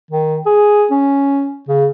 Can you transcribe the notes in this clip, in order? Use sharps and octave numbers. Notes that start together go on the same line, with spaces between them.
D#3
G#4
C#4
C#3